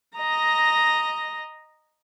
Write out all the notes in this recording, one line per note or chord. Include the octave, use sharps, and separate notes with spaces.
D#5 A#5